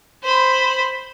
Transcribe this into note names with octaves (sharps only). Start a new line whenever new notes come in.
C5 B5